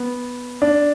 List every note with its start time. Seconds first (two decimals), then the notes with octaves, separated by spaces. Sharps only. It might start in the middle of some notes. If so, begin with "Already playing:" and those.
Already playing: B3
0.62 D4